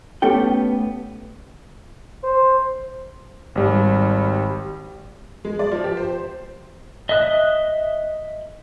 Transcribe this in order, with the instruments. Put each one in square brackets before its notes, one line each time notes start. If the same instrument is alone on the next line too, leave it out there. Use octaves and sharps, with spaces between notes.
[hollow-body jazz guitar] A3 B3 C#4 G4 A4 G5
[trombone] C5
[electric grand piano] G#1 G3
[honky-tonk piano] G#3
D5
F3
G4
C5
[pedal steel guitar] D#5 E5 D#6 F#6